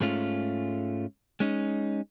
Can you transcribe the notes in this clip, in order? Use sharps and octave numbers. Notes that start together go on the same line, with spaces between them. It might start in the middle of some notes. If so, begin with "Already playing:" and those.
G#2 G#3 A3 C#4 F4
G#3 C#4 D#4